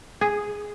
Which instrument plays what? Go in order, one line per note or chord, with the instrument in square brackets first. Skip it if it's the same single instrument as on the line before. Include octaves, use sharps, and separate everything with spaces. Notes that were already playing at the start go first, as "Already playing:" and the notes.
[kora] G#4